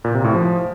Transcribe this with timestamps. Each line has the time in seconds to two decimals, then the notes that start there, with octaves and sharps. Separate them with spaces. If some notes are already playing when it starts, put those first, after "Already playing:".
0.04 A#2
0.14 C3
0.24 A2
0.34 F3